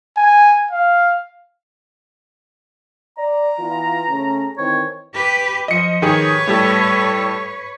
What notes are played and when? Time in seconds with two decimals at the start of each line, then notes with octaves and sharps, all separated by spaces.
0.17 G#5
0.71 F5
3.18 D5 A#5
3.59 E3 B3 F4
4.08 C#3 A3 C#4
4.58 D#3 E3 C4 C#5
5.14 G4 B4
5.68 F3 D#5 C#7
6.02 D#3 G4 G#4 B4 C#5
6.47 A2 G3 A4